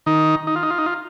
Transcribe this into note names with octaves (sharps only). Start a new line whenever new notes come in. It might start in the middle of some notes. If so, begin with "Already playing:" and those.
D#3 D#4
D#4
F4
D#4
F4
D#4
F4